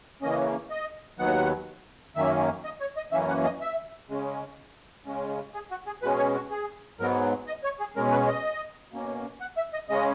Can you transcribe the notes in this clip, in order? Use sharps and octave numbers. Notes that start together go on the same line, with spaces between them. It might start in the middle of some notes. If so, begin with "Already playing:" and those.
C#3 E3 A#3 C#4 D#5
D#5
D#2 D#3 F#3 B3 F#5
F#2 D#3 A#3 C#4 E5
D#5
C#5
D#5
F#2 E3 A#3 C#4 E5
F#5
D#5
E5
C#3 G#3 C#4
C#3 G#3 C#4
G#4
F#4
G#4
B2 G#3 C#4 B4
C#5
F#4
G#4
G#2 F#3 B3 A#4
D#5
C#5
G#4
B2 G#3 C#4 A#4
B4
D#5
B2 A#3 C#4
F#5
E5
D#5
C#3 G#3 C#4 D#5